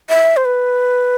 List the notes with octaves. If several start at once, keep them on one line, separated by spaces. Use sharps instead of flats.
E5
C5
B4